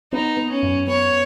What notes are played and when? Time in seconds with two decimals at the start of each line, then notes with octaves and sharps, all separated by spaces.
0.12 B3 D#4
0.37 B3
0.50 C#4
0.63 F#2
0.87 B3 C#5